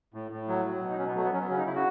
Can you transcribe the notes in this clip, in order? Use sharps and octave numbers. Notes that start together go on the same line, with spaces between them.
A2
A2
F#3
F#3
B2
D#4
B2 C#4
B3
F#3 A3
B3
F#3 C#4
B3
C#3 C#4
D#4
C#3 E4
F#4